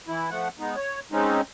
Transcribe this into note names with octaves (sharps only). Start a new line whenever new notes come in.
E3 E4
F3 A3 F#5
G#3 B3 D#4
C#5
G#3 C4 C#4 D#4